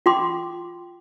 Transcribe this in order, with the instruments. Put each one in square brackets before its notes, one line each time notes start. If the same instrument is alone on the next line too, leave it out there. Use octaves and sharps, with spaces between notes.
[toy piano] F4 G5 C6 D6